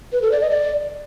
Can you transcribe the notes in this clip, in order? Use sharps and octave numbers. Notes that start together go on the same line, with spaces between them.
B4
A4
D5
D#5
D5